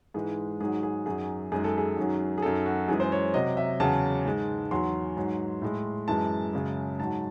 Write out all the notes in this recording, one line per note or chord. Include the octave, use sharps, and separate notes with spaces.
G#2 E3 G#3 G#4
G#2 D#3 F#3 G#4
G#4
F#2 D#3 F#3 G#4
F#2 D#3 G#3 G#4
A4
G#4
F#2 D#3 F#3
G#4
F#2 D#3 F#3 A4
F#4
F#2 E3 G#3 G#4
C5
C#5
C3 F#3 D#5
E5
E2 C#3 F#3 A5
G#2 D#3 G#3
E2 D#3 F#3 C6
G#2 F#3
A2 G#3
F#2 E3 G#3 A5
F#2 C#3 G#3
G#2 F#3 A5